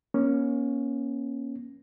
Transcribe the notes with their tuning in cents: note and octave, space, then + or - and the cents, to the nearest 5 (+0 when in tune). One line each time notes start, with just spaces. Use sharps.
A#3 +35 C#4 +0